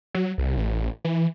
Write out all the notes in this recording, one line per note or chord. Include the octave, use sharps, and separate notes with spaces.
F#3
C2
A1
E3